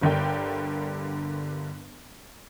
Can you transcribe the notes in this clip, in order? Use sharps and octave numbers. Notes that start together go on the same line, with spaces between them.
G1 G2 D3 A#4 D5 G5